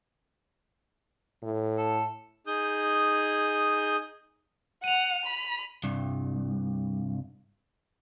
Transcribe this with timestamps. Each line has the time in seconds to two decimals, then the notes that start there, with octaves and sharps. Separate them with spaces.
1.43 A2
1.78 A4
2.47 D#4 G#4 D#6 G6
4.84 F#5 D#7 F7
5.26 B5
5.84 C2 G2